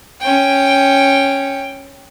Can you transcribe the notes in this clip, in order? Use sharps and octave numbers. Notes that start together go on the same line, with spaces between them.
C#4 G5